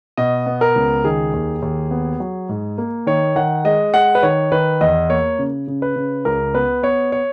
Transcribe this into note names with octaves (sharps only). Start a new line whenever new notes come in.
B2 D#5
B3
A#4
C#2
D#3 G#4
D#2
D#2
B3
F#3
G#2
A#3
D#3 C#5
D#3 F#5
G#3 D#5
G#3 F#5
B4
D#3 C#5
D#3 B4
E2 D#5
A#3 C#5
C#3
C#3
B4
C#3
C#2 A#4
B3 B4
B3 C#5
C#5